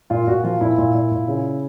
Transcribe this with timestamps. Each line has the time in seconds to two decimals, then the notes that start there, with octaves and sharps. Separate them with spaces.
0.10 A#2 F4
0.27 A#2 F#4
0.44 F3 F4
0.61 A#2 E4
0.78 A#2
0.95 A#2
1.11 A#2
1.28 C#3